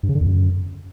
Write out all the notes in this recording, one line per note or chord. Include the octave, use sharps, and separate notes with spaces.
G2
C#3
D3
E2
F#2